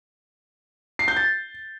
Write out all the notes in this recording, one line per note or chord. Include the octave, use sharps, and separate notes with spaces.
C7
G6
A6